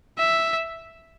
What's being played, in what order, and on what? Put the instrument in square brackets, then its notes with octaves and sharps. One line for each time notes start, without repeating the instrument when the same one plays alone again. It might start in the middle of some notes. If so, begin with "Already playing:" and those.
[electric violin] E5